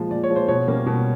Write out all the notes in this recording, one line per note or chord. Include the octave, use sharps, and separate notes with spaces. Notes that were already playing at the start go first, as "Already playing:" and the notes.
Already playing: A#2 F3 G#3
A#2 D5
C#5
F3 G#3
C5
B2 C#5
G3 A#3 C#4
B2